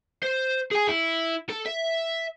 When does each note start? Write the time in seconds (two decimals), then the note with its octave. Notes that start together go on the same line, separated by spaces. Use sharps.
0.23 C5
0.72 G#4 G#5
0.89 E4
1.49 A4
1.66 E5